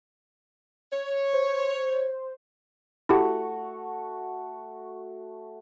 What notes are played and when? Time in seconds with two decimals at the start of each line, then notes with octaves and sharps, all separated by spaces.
0.92 C#5
1.33 C5
3.09 A3 E4 F#4 G4